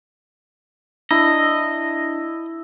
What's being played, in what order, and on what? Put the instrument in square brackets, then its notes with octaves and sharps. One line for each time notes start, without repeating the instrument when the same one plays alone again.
[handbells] D4 [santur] E4 [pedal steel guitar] D#5